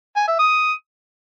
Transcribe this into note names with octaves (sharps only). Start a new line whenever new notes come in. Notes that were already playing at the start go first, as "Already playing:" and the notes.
G#5
E5
D#6